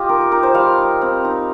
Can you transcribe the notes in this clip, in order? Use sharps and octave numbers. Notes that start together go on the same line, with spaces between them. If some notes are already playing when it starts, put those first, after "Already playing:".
Already playing: F4 G4 D#5
D#4 A#4
A#4
D#4 A#4
C5
G3 F5
D#4
C4
D#4